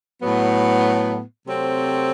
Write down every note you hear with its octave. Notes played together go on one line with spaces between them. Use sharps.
A2 F#3 B3
C3 F#3 A3 C4